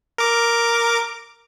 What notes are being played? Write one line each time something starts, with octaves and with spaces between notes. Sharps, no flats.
A#4 D6